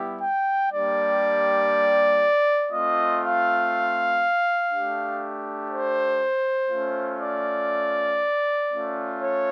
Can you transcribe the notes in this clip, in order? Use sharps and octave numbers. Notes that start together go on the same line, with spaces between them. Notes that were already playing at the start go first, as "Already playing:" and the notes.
Already playing: G3 B3 E4 G4
G5
G3 A#3 D4 G4 D5
A3 C4 F4 D#5
F5
A3 D4 G4
C5
A3 C#4 F4
D5
A3 C#4 F4
C#5